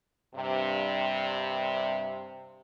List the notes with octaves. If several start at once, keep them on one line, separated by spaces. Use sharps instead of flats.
G2 C3